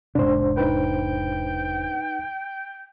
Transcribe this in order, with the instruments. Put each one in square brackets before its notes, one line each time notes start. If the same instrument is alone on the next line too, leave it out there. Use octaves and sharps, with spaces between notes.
[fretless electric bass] E1 G#2 C3 [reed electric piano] D4 C5
[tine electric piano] D#4 B4 [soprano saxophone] G5